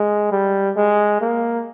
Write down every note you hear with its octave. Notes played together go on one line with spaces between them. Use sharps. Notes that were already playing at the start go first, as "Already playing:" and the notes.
Already playing: G#3
G3
G#3
A#3